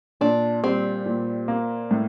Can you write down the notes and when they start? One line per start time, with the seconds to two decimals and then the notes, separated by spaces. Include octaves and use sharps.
0.21 A#2 D4
0.63 G3 C4
1.06 A#2
1.48 A#3
1.91 A2